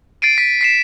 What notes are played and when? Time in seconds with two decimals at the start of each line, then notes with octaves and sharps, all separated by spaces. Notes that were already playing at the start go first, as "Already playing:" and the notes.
0.22 A6 C7 D7 D#7
0.38 B6
0.61 B6 C7 E7